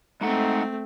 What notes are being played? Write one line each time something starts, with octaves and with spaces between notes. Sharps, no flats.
G#3 A3 C4 D#4 F#5